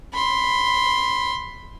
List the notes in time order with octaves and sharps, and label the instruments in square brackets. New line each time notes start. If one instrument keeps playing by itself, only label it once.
[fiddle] B5 C6